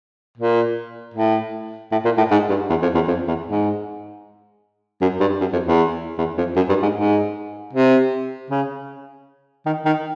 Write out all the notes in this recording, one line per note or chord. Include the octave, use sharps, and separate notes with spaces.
A#2
A2
A2
A#2
A2
G#2
G2
E2
F2
E2
F2
E2
G#2
F#2
G2
F#2
F2
E2
E2
F2
F#2
G2
G#2
G#2
C3
C#3
D#3
D#3